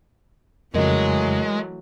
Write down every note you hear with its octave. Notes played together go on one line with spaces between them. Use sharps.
F2 C#3 E3 F#3 G#3 A3 A#4 D#5